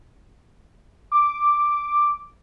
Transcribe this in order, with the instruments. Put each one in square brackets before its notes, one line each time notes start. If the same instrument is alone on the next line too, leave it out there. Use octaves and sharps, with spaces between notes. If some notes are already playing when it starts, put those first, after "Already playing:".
[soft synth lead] D6